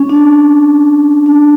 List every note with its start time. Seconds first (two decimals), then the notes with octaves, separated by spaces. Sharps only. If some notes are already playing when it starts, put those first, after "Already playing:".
Already playing: C#4
0.09 D4
1.26 D4